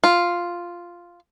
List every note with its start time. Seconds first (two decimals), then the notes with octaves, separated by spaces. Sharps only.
0.04 F4